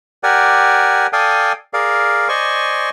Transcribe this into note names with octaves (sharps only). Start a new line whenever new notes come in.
G4 A#4 D5 F#5 G#5
A4 D5 F5 G5 G#5 D#6
G#4 A#4 D5 F5
C5 D5 D#5 G#5 C#6